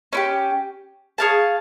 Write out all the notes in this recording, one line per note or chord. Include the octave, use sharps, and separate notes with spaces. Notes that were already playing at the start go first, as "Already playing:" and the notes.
C#4 E4 G4
G#4 C#5 F5 A5